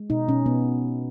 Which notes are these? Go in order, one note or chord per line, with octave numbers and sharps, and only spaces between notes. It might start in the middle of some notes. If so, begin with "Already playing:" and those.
Already playing: G#3
B2 D#4
B2 C#4
B2 B3